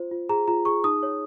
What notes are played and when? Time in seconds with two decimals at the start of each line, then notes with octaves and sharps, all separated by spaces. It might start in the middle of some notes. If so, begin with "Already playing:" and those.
Already playing: F4 C5
0.11 F4
0.29 G#4 A#5
0.48 F4 A#5
0.65 G#4 C#6
0.84 D#4 D#6
1.03 C#5